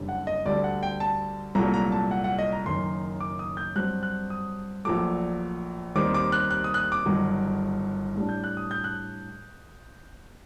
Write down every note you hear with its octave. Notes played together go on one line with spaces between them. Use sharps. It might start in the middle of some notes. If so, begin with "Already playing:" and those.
Already playing: F#1 F#2 D3 G3 D4
F#5
D#5
D2 D3 G3 D5
F#5
G5
A5
C2 A#2 F#3 A3 A#5
A#5
A5
F#5
F#5
D#5
A#5
F#1 F#2 D#3 C6
D6
D#6
G6
G2 F#3 C4 F#6
F#6
D#6
A#1 A#2 F#3 A3 D6
D#2 D#3 G3 C4 D6
D6
F#6
F#6
D#6
F#6
D#6
D6
G1 G2 D#3 F#3
A2 G3 D4
G6
F#6
D#6
G6
F#6